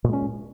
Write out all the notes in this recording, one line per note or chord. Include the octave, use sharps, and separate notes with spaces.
A#2 G#3 C#4